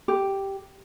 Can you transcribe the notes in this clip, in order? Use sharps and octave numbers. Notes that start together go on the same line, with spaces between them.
G4